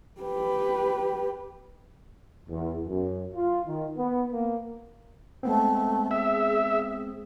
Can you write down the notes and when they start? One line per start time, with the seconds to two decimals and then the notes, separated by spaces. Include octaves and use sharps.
0.21 G4 B4
2.50 E2
2.87 F#2
3.35 F4
3.65 D#3
3.97 B3
4.32 A#3
5.43 G#3 A3 B3 C4
6.11 G#4 E5